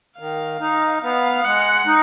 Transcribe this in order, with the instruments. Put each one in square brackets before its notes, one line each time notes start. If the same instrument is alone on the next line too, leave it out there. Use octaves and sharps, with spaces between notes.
[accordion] D#3 [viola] F5
[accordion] D#4
[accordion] B3 [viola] F5
[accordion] G#3 [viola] F#5
[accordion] D#4